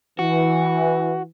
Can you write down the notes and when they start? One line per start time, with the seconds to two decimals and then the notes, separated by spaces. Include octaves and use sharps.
0.19 E3 F#4